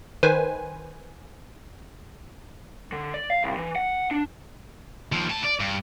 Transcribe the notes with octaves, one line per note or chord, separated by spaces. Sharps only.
D#3 B4 C5 G#5
D3
D5
F5
C2
E3
F#5
D4
D#2 F3
A2 A5
D5
G2